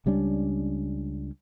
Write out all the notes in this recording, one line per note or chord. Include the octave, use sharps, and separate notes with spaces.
C#2 G3 C#4 D4